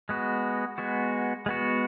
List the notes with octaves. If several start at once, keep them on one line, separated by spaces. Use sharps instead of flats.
G#3 B3 F#4
G#3 B3 F#4
G#3 B3 F#4